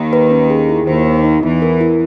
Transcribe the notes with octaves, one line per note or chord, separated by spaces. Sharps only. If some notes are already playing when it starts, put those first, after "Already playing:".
Already playing: D#2 D#3
B4
C#4
G#4
E4
D#2 D#3 C5
D#4
D#4
E2 E3 E4
A#4
E4